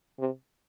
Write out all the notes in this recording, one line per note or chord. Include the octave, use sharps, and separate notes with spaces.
C3